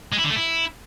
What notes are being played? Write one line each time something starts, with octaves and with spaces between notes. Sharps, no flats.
G#3
E4
D3
A3
E4